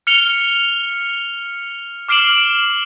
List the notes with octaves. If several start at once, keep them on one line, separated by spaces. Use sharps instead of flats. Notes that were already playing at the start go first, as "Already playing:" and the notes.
F6 C#7 F7 G7
D6 F6 C7 D7 E7 F#7